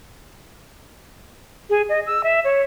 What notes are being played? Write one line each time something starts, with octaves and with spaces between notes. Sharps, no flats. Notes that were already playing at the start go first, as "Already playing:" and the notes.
G#4
D#5
E6
E5
C#5